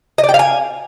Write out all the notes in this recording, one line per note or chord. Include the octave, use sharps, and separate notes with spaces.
D#5
D5
G5
F5
G#5